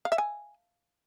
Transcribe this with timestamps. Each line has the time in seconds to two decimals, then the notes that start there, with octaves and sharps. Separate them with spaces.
0.05 F5
0.12 E5
0.18 G#5